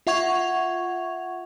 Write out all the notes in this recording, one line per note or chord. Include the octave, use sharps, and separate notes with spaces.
F4 E5 F#5 C#6 G#6 F7